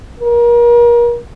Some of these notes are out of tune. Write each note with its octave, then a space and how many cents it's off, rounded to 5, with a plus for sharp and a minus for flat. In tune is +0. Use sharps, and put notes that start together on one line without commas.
A#4 +35